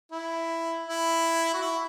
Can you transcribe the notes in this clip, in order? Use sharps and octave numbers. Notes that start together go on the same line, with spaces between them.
E4
E4
F#4
E4